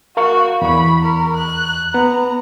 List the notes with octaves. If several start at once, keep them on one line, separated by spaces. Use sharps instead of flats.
F#4 A#4 F5 C#6
E2 B5 C#6
A#4
F#6
B3 A#5